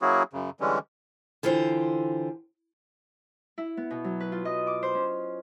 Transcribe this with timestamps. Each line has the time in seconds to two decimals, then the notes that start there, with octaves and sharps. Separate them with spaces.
0.02 F#3 A#3 C#4 E4 F#4 G#4
0.33 F#2 C#3
0.60 D3 E3 G3 G#3 C#4
1.43 D3 E3 F4 G4 C5
3.58 E4
3.77 B3
3.91 B2
4.04 F#3
4.20 B4
4.32 F4
4.45 D#5
4.67 D6
4.83 C5
4.95 C#4